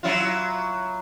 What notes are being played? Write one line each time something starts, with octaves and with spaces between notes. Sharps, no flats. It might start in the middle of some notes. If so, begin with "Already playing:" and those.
F#3 E4 F4